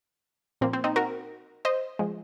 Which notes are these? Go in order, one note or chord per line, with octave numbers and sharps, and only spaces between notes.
A#2 F3 A#3 C4
C4
C4 D#4
F#4 A#4
C5 D#5
F3 G#3